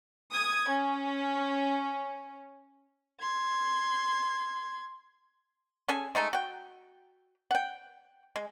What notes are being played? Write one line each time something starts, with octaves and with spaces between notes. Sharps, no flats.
D#6 G#6
C#4
C6 G#6
C#4 G#4 A4 G#5
G#3 A3 D#4 A4
F#4 G5
F#5 G5
G#3